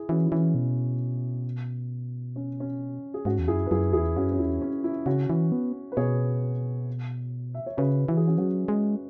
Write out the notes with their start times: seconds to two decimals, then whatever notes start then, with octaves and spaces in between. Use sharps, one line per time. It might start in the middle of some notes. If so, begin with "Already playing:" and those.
Already playing: E4 G#4
0.09 E3 C#4 F#4
0.26 E4
0.31 E3 C#4
0.55 B2
2.36 C#4
2.60 C#4
3.14 G#4
3.25 G#2 C#4 F#4
3.39 E2
3.48 F#2 E4 G#4
3.66 B4
3.71 F#2 E4 G#4
3.93 E2 E4 G#4
4.16 F#2 C#4 F#4
4.32 C#4
4.39 E2 E4
4.62 C#4
4.84 E4
5.06 C#3 C#4 F#4
5.30 E3
5.52 B3
5.92 B4
5.97 B2 G#4 C#5
7.54 E5
7.66 C#5
7.77 C#3 F#4 B4
8.08 E3 F#4
8.17 G#4
8.27 C#4 F#4
8.38 F#3 C#4 F#4
8.68 G#3